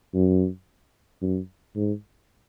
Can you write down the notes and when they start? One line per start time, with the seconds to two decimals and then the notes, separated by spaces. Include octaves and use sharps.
0.14 F#2
1.22 F#2
1.75 G#2